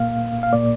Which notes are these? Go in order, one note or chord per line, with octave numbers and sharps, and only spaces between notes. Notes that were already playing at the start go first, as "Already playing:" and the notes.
Already playing: A#2 A#3 F5
F5
A#2 A#3 D5